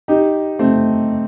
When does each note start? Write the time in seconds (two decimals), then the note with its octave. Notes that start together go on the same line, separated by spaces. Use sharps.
0.08 D#4 G4
0.59 A3 C4